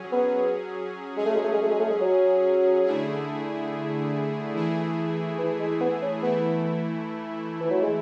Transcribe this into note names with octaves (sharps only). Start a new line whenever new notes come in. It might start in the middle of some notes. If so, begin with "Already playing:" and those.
Already playing: F#3 C#4 G#4
B3
F#3 G#3 C#4 G#4
A3
G#3
A3
G#3
A3
G#3
A3
G#3
F#3
D3 A3 E4 G#4
E3 A3 E4 G#4
E3
G#3
B3
C#4
E3 A3 B3 E4
E3
F#3
G#3